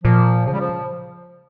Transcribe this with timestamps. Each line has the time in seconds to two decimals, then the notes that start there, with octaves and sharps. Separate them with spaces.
0.04 A#2 F3
0.46 C#3 F3
0.54 G3
0.60 F3